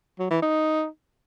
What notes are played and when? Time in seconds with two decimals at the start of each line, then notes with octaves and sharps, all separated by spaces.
0.19 F#3
0.31 E3
0.42 D#4